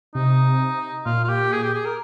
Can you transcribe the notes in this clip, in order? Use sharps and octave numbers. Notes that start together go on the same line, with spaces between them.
C3 D#4
A#2 F4
F4
G4
G#4
G4
G#4
A#4